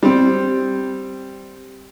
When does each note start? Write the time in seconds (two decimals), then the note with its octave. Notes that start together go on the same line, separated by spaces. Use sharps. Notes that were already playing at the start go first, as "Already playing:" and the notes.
0.03 G3 C4